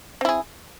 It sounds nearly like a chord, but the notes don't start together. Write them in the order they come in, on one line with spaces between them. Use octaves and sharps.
C4 E4 G#4